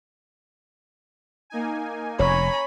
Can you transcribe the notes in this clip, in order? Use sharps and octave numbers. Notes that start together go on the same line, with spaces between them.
A#3 D#4 G#5
F1 C#5 G#5 A#5 B5